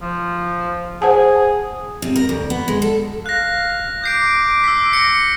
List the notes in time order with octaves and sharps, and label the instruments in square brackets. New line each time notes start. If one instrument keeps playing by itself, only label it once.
[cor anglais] F3
[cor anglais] G#4 [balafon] C5 F#5 A5
[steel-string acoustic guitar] C3
A#4
D2
B3
G#3
A4
[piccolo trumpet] F5 [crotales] F#6 A#6
[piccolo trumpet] D6 [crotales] G6 C7 D7
[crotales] E6 B6
A#6 C#7